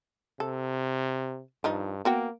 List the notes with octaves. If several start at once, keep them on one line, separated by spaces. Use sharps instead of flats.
C3 A4
G2 D#3 F3 D#4
A#3 B3 F#4 G5